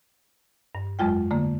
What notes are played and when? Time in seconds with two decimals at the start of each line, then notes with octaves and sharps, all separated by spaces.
0.75 G2
0.99 F2 F#3 G#3 F4 G5
1.31 D3 A3 A#3